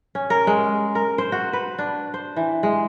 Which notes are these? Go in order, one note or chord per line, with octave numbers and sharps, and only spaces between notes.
C#4
A#4
G#3
A#4
C5
F#4
B4
D4
C5
E3
G#3